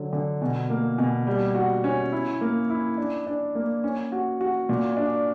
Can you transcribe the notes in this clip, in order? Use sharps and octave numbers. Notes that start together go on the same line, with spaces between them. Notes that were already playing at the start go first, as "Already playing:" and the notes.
Already playing: D3 F#3
D3
B2
A#3
B2
G3
F#4
C#4
E4
A#3
E4
D4
D4
A#3
C#4
F#4
F#4
A#2
D4